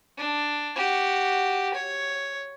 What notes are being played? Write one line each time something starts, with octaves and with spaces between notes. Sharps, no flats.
D4
F#4 G4
C#5